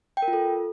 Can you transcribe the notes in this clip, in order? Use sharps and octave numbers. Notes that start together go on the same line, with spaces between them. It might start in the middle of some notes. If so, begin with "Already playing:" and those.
G5
A#4
F4
A4